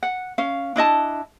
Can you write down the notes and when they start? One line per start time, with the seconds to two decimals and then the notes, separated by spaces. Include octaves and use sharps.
0.03 F#5
0.38 C#4 F5
0.76 D4 E4 D#5 A5